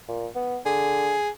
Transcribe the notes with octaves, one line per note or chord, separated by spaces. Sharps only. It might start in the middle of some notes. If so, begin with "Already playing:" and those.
A#2
B3
D3 G#4